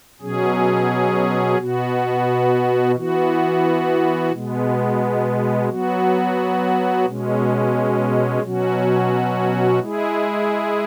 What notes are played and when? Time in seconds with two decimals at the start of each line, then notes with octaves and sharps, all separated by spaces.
0.21 B2 F#3 C#4 G#4
1.58 B2 B3 F#4
2.95 E3 B3 F#4
4.32 B2 G#3 B3
5.69 F#3 B3 F#4
7.06 B2 G#3 C#4
8.42 B2 F#3 C#4 F#4
9.79 G#3 E4 G#4